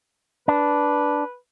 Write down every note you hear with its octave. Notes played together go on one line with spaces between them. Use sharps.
D4 B4